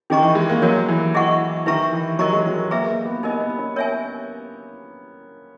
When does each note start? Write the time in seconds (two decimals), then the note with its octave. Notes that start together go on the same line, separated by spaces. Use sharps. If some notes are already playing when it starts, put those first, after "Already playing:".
0.10 D#3 C#4 G#4 D#5 A#5 C#6
0.22 E3
0.35 G#3
0.50 A#3
0.62 F#3 F#4 A#4 C#5
0.88 E3
1.14 E4 G#4 D#5 F#5 C#6
1.66 D#3 E4 B4 E5 A#5 C#6
1.93 E3
2.19 F#3 A#4 D#5 A#5 C#6
2.33 G#3
2.47 F#3
2.71 A#3 G#4 B4 E5 A#5
2.89 A#3
3.05 B3
3.23 B3 D#4 A#4 D#5
3.40 B3
3.59 C#4
3.76 A#4 C#5 E5 G#5